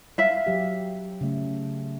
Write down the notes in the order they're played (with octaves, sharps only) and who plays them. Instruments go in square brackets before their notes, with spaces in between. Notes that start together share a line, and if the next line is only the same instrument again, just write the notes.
[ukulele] E5 F5
[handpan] F#3 G4
C#3 A3